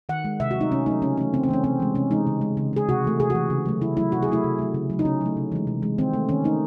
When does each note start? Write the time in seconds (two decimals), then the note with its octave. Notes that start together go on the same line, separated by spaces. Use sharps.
0.09 D#3 F#5
0.25 G#3
0.40 C3 E5
0.51 F#4
0.56 F#3 A3 D#4
0.72 C3 C#4
0.86 F#3 A3 D#4
1.02 C#3 C#4
1.17 E3 A3 C#4
1.33 C#3 C4
1.43 C4
1.49 E3 A3 C#4
1.64 C3 C4
1.80 E3 G#3
1.95 C3 C#4
2.11 E3 G#3 D#4
2.27 C#3
2.42 G#3
2.57 C#3
2.73 G#3 G#4
2.89 C3 F#4
3.04 E3 A3
3.20 C3 G#4
3.30 F#4
3.35 E3 A3
3.50 C#3
3.66 F#3 A3
3.81 C#3 E4
3.97 F#3 A3 E4
4.12 C3 F#4
4.23 G#4
4.28 F#3 A3 E4
4.44 C3
4.59 F#3 A3
4.74 C#3
4.90 F#3 A3
4.99 D#4
5.05 C#3 C#4
5.21 F#3 A3
5.37 C3
5.52 E3 G#3
5.67 C3
5.82 E3 G#3
5.98 D#3 C4
6.14 A3
6.29 D#3 C#4
6.44 A3 D#4